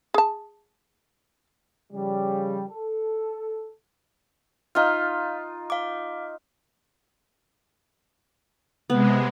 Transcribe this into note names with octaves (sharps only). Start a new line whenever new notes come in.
G#4 A5
C#3 F3 G3
A4
D#4 F4 F5 F6
F5 D6
C3 G#3 B3